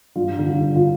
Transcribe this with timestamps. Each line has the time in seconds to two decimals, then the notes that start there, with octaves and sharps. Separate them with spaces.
0.16 G2 F4
0.39 D3
0.46 F4
0.60 D3
0.76 F4